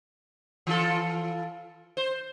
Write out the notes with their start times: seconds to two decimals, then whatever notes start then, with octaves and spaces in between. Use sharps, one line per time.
0.67 E3 F4 A4
1.97 C5